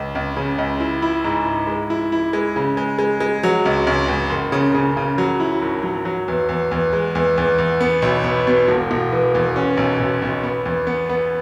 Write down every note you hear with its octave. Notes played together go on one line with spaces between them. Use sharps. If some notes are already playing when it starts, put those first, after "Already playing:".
Already playing: C#2
C#2
C#3
C#2
E4
E4
G#2
E4
G#3
E4
E4
G#3
C#3
G#3
G#3
G#3
F#3
C#2
C#2
C#2
F#1
C#3
C#3
C#3
F#3
E4
G#1
F#3
F#3
E2
E2
E2
G#3
E2
E2
E2
B3
B1
B3
B2
E1
E1
E3
E2
C#4
B1
B1
B1
B3
E2
B3
B3